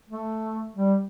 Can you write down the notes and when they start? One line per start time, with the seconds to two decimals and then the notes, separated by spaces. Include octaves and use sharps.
0.09 A3
0.76 G3